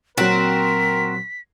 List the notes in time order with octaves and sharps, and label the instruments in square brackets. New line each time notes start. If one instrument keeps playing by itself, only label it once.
[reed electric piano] A#2 F#3 [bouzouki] C4 F#4 [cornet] A#4 [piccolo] B6